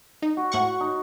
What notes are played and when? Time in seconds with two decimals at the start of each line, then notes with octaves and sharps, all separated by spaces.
0.22 D#4
0.37 F#4
0.52 A2 F#5 C#6
0.81 D#4